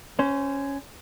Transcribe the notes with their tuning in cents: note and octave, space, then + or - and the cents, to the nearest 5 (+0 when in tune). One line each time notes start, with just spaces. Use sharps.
C#4 +0 C5 -25